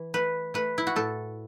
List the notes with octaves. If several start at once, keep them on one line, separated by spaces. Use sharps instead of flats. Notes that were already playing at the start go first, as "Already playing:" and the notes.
Already playing: E3
A3 B4
A3 B4
E4
F#4
A2 A4